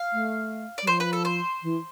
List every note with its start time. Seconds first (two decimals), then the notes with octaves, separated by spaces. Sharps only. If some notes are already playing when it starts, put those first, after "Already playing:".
Already playing: F5
0.13 A3
0.78 D5
0.82 G3
0.87 F3 C5
1.00 B4
1.13 A4
1.25 C5
1.63 E3